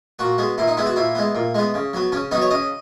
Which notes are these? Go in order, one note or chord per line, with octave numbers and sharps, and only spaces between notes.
A#2 F#4
G#3 B3
A#2 E4
D#4
G#3 B3 E4
F#4
A#2 E4
G#3 B3
A#2
G#3 B3
C#3
F#3 B3
C#3 C#4
F#3 B3 D#4
C#5
C#3 D#5